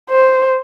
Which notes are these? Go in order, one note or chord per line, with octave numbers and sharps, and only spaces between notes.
C5